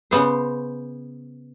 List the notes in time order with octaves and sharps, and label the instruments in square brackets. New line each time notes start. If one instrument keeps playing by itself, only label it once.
[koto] C#3 B3 C5